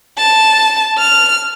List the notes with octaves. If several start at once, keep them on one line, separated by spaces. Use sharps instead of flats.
A5
F6